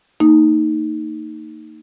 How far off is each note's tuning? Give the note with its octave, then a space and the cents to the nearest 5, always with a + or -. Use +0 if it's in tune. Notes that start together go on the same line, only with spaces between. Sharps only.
A#3 -35 D#4 +0